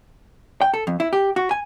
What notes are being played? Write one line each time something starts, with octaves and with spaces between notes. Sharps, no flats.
G5
A4
F2
E4
G4
F#4
G#5